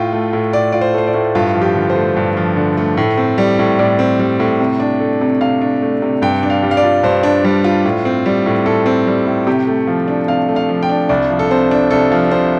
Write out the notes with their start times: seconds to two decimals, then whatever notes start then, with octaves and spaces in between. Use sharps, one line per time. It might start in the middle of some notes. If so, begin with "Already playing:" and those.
Already playing: A2 F4 G5
0.13 A3
0.33 A2
0.53 A2 D5
0.72 F4 D5
0.81 C5
0.94 A3 C5
1.07 D5
1.14 A2
1.35 G2 F4
1.55 F3
1.61 G4
1.75 D3
1.90 C5
1.95 A3
2.16 G2
2.37 F3
2.57 D3
2.77 A3
2.97 A2
3.18 C4
3.38 G3
3.59 A2
3.79 A2 D5
3.99 C4
4.19 G3
4.40 A2
4.60 C3
4.80 D4
5.00 A3
5.21 C3
5.41 C3 F5
5.62 D4
5.82 A3
6.02 C3
6.22 G2 G5
6.43 D4
6.50 F5
6.63 G3
6.71 F5
6.77 D5
6.84 F4
7.03 G2 C5
7.23 D4
7.44 G3
7.64 F4
7.85 A2
8.05 C4
8.26 G3
8.46 A2
8.65 A2 A4
8.86 C4
9.07 G3
9.27 A2
9.47 C3 G4
9.67 A3
9.87 F3
10.08 D4
10.28 C3 F5
10.49 A3
10.56 F5
10.69 F3
10.83 G5
10.89 D4
11.09 C2 D5
11.30 F3
11.39 A4
11.51 C3 C5
11.71 D4
11.91 C2 A4
12.12 F3
12.31 C3 C5